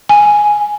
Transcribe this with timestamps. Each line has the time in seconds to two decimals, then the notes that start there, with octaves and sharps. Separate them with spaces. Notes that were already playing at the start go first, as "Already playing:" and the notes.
0.09 G#5